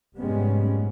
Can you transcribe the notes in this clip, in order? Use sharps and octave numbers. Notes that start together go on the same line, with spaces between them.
F1 G#2 G3 G#3 B3 C#4